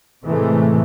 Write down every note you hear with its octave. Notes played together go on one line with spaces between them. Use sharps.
A2 C3 E3 G#3 A3